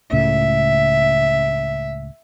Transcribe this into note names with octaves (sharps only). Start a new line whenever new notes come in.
C#2 A2 C#3 E5